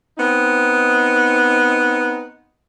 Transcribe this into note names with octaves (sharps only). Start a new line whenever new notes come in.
B3 C4 D#4